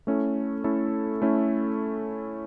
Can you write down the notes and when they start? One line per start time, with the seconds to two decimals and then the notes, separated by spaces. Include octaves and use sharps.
0.07 A3 C#4 E4 A4
0.64 A3 C#4 E4 A4
1.22 A3 C#4 E4 A4